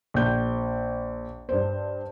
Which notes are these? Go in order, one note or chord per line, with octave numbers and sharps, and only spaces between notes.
A#1 G6
G2 C5